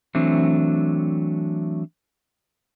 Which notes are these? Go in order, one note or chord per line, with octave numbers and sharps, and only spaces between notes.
E3 F#3 A3 C4 D4